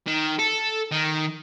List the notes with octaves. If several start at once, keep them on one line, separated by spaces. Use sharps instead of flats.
D#3
A4
D#3